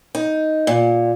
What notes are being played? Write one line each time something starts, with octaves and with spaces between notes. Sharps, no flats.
D#4
A#2